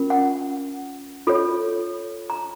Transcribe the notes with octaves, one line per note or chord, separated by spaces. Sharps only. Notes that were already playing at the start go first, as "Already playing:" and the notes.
Already playing: C#4 F4 A#4
F#5
F4 A4 C#5
A#5